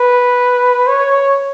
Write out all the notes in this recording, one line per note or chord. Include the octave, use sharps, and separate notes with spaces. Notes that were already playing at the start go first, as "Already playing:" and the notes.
Already playing: B4
C#5